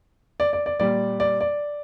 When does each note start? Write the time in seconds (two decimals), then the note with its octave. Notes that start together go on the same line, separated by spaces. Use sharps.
0.40 D5
0.53 D5
0.66 D5
0.79 A#2 G3 D5
1.20 D5
1.41 D5